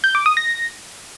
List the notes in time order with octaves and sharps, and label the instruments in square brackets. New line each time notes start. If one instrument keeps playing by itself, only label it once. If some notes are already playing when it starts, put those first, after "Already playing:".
[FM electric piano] G6
D6
D#6
A#6